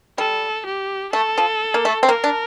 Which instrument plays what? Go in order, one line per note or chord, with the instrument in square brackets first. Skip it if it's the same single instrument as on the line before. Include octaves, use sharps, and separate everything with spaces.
[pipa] G3 [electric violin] A4
[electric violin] G4
[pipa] A3 [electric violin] A4
[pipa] F3
A#3
A3
C4
[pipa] A#3 [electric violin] A#4
[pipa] D4